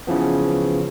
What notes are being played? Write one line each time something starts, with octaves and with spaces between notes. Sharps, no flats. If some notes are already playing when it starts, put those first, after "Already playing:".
C#3 E3 F3 B3